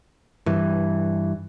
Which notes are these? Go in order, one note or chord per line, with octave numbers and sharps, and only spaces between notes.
G2 E3